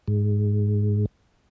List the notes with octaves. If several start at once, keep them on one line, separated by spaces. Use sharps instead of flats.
G#2